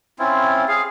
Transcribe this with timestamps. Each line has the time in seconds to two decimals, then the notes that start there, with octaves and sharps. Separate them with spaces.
0.19 C4 C#4 E4 F4
0.68 G#4 F5